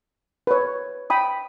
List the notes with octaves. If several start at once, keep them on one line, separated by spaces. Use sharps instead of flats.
B4 C#5
G5 B5 D#6